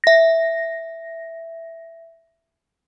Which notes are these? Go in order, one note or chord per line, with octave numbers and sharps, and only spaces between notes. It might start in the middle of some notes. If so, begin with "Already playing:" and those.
E5 A#6